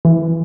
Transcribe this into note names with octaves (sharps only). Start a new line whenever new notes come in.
E3